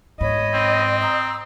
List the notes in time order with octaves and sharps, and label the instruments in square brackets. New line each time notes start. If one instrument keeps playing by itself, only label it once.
[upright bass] G#2 [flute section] C#5 B5 [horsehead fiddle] D#5
[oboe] C4
[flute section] A#5 D#6 E6